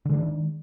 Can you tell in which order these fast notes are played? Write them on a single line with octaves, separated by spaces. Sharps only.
D3 G#3 D4 D#3